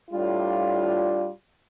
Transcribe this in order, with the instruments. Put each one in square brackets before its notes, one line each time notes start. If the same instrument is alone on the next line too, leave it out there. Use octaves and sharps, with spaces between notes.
[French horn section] A2 G3 D4 F4